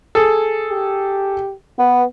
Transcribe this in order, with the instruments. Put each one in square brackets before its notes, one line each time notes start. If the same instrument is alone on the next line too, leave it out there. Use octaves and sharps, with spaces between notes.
[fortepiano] G#4 A4
[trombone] G4
[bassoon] B3 [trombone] B4